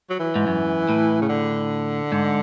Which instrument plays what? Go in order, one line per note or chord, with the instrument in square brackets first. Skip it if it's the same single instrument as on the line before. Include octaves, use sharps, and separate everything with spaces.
[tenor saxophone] F#3
E3
[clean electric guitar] G#2
F#2
A2
[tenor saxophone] C#3
D3
[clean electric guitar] G#2